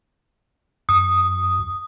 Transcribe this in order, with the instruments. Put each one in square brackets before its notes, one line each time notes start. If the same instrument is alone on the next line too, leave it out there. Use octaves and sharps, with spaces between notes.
[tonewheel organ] F#2 [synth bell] D#6